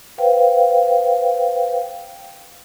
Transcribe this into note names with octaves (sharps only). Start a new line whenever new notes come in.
B4 C5 F5 G5